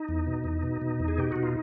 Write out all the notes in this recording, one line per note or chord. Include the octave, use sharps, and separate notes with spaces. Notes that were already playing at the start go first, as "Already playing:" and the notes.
Already playing: D#4
E2
B2
E2
B2
B2
E2
G#4
B2 G4
B2 F#4
F4